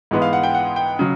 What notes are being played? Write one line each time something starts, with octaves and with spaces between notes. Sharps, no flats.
G#2 E3 G#3 B3
F5
F#5
G5
F#5
G5
C#3 F#3